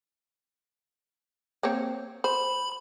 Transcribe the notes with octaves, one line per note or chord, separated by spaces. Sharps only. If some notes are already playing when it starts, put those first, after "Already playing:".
A#3 C4 C#5
C5 B5